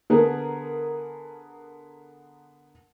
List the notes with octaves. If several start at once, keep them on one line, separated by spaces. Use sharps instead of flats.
D3 B3 G#4 A#4